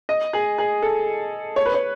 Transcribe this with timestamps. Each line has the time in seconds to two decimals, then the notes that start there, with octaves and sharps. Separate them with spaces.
0.09 D#5
0.33 G#4
0.58 G#4
0.82 A4
1.56 C#5
1.66 B4
1.74 C#5